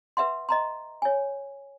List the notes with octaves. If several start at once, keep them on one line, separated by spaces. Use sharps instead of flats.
B4 E5 F#5 C6
D#5 A#5 C6
C#5 G#5